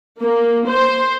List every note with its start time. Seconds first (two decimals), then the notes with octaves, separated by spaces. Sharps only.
0.20 A#3
0.68 C5